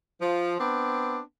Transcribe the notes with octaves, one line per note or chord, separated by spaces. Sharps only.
F3
B3 C4 D4